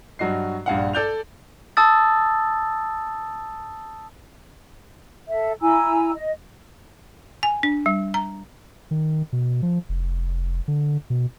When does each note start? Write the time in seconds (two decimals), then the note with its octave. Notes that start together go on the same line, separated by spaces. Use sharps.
0.19 G2 F#3 F#4 D#5 C7
0.66 A#1 G2 F5 F#5
0.93 A4 D5 G6 F7
1.77 A5 D#6 E6 A6
5.29 A4 E5
5.61 E4 G#5 A#5 E6
6.15 D#5
7.43 G#5
7.63 D4
7.86 G3
8.14 A#5
8.91 D#3
9.33 B2
9.62 F3
9.89 F1
10.68 D3
11.10 B2